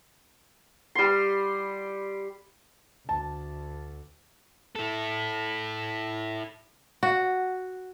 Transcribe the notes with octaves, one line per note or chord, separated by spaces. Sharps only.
G3 C6
D2 A5
E4 A4
F#4